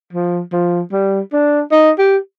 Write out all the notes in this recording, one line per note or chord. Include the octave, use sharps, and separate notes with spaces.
F3
F3
G3
D4
D#4
G4